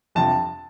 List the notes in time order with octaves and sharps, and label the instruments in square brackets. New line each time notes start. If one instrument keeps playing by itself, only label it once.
[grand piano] G1 F2 C3 F3 A5